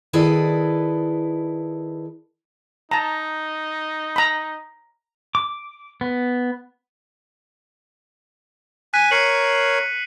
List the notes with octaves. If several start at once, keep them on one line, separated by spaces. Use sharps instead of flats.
D#3 E4 G#4 A4 B4 D5
D#4 A5 A#5
A#5 B5
D6
B3
G#5 F#6 B6 D#7
A#4 C#5 C7 C#7 F#7